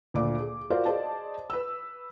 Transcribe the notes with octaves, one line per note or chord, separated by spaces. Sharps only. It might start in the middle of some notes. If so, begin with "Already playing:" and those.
D2 A#2 D5 D6
G#4
F4 F#4 A#4 C5 D5 F5
G#4 C5 D5 D#5 A5
B4 E6